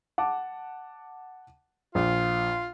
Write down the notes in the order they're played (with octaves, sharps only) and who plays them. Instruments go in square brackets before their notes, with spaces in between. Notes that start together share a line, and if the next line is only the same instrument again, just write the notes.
[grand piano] F#5 A5 D6
[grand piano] A#1 [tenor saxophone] F4